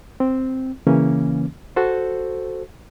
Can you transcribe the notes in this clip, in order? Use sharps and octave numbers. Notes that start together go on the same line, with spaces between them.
C4
C#3 E3 A#3 C#4
F#4 A4 C5